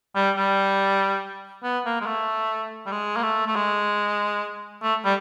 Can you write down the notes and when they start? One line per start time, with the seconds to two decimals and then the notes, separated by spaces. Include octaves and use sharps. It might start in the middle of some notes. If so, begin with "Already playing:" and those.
0.16 G3
0.36 G3
1.64 B3
1.86 A#3
2.01 G#3
2.06 A3
2.86 G3
2.92 G#3
3.16 A#3
3.23 A3
3.47 A3
3.56 G#3
4.83 A3
5.05 G3